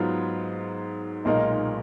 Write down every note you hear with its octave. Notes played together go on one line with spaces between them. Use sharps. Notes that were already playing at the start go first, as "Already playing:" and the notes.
Already playing: G#2 F#3 B3 F4
B1 A#2 G#3 D#4 A#4